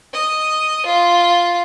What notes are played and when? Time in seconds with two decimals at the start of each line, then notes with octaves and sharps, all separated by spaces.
0.14 D#5
0.86 F4